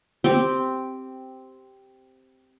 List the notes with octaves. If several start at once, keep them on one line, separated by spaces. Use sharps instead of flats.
C4 G4 G5